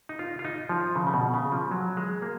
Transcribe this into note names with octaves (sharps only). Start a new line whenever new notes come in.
D#4
F4
F4
D#4
F3
C#3
C#3
B2
C#3
F3
F#3
G#3
A#3